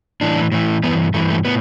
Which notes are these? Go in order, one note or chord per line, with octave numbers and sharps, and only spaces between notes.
A2 E3 D4
A2 E3
G2 E3 B3
G2 E3 A3
A3
A2 B3